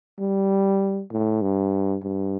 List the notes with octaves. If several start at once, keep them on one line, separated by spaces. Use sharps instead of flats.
G3
A2
G2
G2